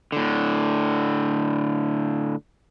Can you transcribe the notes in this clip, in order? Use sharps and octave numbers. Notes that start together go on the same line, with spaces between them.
A2 D3